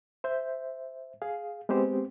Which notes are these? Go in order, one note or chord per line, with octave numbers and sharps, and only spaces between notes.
C5 E5 G6
G#4 F5
G#3 B3 C4 G4 C5